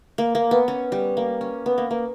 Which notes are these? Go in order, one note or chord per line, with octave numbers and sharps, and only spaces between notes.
A#3
A#3
B3
C#4
G3
A#3
C#4
B3
A#3
A#3